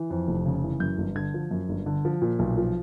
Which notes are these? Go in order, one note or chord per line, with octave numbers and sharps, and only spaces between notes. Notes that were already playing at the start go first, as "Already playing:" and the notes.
Already playing: E3
F2
F1
C#3
E3
F#2 G6
G1
D3 G#6
F3
F#2
G1
D3
F3
A#2
B1
F3